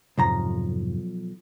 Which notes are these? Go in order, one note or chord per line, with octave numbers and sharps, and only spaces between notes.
B1 F2 G#2 C3 F3 A#5